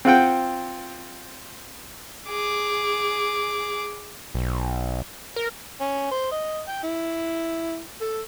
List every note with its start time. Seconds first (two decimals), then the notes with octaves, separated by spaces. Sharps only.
0.05 C4 F4 F#5 G5
2.28 G#4 D6
4.35 B1
5.36 A#4
5.81 C#4
6.12 C5
6.32 D#5
6.68 G5
6.84 E4
8.01 A4